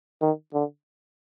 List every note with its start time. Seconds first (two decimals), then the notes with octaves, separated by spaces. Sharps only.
0.21 D#3
0.54 D3